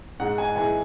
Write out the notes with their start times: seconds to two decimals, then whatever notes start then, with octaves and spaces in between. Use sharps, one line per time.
0.20 G#2 F#5
0.38 G#5
0.56 E3 G#3 G#5